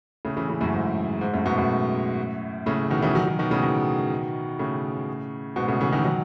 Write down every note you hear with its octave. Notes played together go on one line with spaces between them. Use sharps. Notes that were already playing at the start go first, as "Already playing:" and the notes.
A2 C#3
C#3 E3
A2 C#3
F#2 A2
G#2
G#2
F#2 A2
G#2 B2
F#2 A2
A2 C#3
B2 D#3
C#3 E3
D#3 F#3
D#3 F#3
B2 D#3
A2 C#3
B2 D#3
A2 C#3
G#2 B2
A2 C#3
C#3 E3
B2 D#3
D#3 F#3